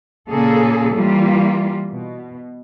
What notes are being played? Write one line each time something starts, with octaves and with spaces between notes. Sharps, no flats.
A#2 C#3 A#3 G#4 A4
E3 G3 A#3 F4
B2